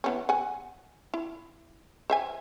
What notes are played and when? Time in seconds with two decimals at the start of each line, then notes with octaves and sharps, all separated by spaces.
0.04 E3 B3 C#4
0.29 F#5 G#5
1.14 E4
2.10 C5 E5 G#5